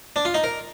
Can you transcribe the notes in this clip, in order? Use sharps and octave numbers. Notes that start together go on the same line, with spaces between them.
D4
F4
D#4
A#4